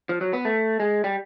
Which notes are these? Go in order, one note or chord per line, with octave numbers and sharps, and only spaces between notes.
F3
F#3
B3
A3
G#3
G3